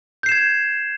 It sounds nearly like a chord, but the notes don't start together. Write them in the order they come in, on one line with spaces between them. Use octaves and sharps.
G6 C7 E7 G#6